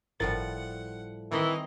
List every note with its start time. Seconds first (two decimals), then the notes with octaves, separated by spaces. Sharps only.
0.20 G1 A2 F3 G3 A#4 F#5 A6
1.32 D#3 E3 C4 E4 D#5